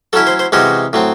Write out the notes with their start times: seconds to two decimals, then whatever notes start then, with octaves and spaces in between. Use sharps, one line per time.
0.13 F#3 C#4 E4 A4
0.27 C5
0.39 C5
0.52 C3 E3 G#3 C#4 F#4
0.93 A2 F#3 C4